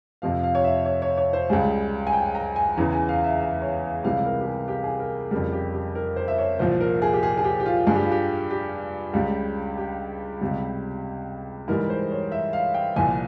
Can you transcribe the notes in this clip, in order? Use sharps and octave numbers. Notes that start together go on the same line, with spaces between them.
F2 C3 F3 F5
F5
C#5
E5
C#5
C#5
C#5
C5
C#2 C#3 G3 G#4
G#5
G5
A#5
G#5
E2 C#3 E3 A#5
G#5
F5
E5
E5
C#5
C#2 C3 E3 G3 F5
A#4
G4
G#4
G4
G#4
A#4
F2 C#3 G3 A#4
G4
G4
A#4
C5
E5
C#5
C2 A#2 F3 C5
A#4
G#4
G4
G#4
G#4
G4
G4
F4
G2 G3 G#4
G4
F4
G4
G4
C#2 C#3 G3
G4
C#2 C3 G3
G#2 E3 G3 A#4
C5
C#5
E5
F5
G5
C2 A#2 F3 G#5